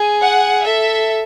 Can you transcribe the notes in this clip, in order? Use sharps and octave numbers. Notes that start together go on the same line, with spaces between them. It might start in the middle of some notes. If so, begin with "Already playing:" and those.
Already playing: G#4 G#5
F#5
A4 E5